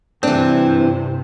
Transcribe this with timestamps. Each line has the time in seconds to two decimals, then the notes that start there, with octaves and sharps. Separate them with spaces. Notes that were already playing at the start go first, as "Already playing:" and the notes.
0.23 G2 C3 E3 C4 D4